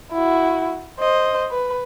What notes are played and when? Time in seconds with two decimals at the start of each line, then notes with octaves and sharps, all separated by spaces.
0.12 E4 F#4
1.00 C5 D#5
1.51 B4